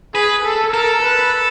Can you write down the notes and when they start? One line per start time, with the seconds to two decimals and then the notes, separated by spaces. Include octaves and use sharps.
0.14 G#4 B4
0.44 A4
0.73 A4 A#4
1.03 B4